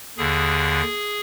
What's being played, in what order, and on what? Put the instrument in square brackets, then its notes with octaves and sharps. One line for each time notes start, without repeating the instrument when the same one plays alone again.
[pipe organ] D#2 D3 G#4